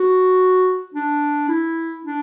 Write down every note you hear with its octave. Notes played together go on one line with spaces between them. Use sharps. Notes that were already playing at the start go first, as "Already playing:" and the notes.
Already playing: F#4
D4
E4
D4